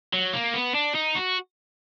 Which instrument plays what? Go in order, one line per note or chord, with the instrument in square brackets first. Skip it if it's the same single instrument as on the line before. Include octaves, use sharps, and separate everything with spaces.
[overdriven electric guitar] F#3
A#3
B3
D4
D#4
F#4